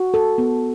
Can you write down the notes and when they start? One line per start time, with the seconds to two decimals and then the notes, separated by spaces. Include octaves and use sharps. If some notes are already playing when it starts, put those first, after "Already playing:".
Already playing: F#4
0.14 A4
0.38 B3